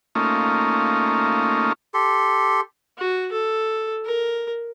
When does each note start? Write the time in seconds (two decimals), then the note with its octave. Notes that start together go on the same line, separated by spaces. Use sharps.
0.15 A3 A#3 C#4 D#4 F4
1.94 G4 A4 C6
2.98 F#4
3.32 A4
4.05 A#4